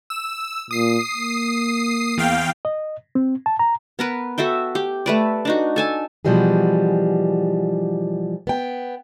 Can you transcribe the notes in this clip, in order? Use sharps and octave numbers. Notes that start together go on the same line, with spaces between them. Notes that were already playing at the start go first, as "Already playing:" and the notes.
E6
A#2 D#6 C7
A#3
E2 F5 G5
D#5
C4
A5
A#5
B3 A#4 B4
F#4 A4 E5 G5
G4
A3 B4 D5
D4 D#4 F#4
A4 G#5 A5
B2 E3 F3 G3 F#4 G#4
B3 G5